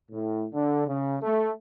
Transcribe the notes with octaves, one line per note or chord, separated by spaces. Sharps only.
A2
D3
C#3
A3